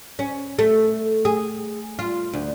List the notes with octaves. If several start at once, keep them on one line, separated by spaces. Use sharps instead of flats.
C#4
A3
G#4
F4
D2